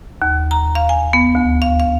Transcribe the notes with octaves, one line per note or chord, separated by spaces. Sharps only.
D#2
A#5
F5
G#5
B3
D2
F5
F5